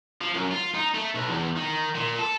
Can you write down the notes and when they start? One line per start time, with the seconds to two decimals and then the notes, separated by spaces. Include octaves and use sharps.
0.21 F3
0.34 F#2
0.51 F4
0.74 D#4
0.95 A3
1.15 B1
1.29 E2
1.56 D#3
1.95 A#2
2.19 A4